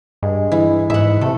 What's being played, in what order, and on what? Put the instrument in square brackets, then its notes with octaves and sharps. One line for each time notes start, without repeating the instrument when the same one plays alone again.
[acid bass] G2 [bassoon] G#3
[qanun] E3
[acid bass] G#2 [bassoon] G#3 [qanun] E5 F#5
[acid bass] C3 [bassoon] A3 [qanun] A4